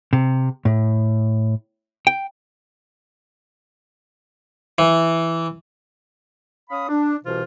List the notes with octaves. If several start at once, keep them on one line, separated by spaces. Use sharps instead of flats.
C3
A2
G5
E3
C#4 F5 B5 D#6
D4
C2 B2 E3 F4 C5